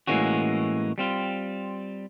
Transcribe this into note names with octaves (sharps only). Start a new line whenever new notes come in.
A2 E3 G#3 A#3 C#4 F#4
G3 C4 F4